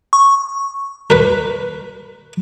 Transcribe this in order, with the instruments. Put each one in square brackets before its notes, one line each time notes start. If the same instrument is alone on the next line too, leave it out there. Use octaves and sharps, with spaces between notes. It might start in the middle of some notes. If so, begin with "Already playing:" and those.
[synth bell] C#6
[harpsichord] A#4 B4